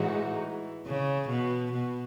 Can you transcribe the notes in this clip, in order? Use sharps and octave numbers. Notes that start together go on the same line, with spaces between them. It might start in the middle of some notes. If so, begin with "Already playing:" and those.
Already playing: A2 E3 G#3 D#4 F#4
C#3
B2
B2